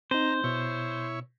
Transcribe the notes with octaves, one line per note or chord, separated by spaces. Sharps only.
C4 D#4 C5 A#5
B2 E4 C#5